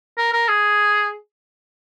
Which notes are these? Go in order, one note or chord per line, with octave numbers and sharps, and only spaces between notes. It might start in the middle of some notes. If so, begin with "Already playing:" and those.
A#4
A#4
G#4